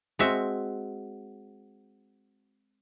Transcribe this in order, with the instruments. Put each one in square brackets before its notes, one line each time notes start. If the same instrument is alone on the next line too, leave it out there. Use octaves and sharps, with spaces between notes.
[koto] G#3 C4 F#4 E5